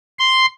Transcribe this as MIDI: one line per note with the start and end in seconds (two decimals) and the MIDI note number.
0.19 0.46 84